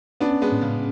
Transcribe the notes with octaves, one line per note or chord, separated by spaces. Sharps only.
B3 C#4 D4
G#3 B3
A2
C#3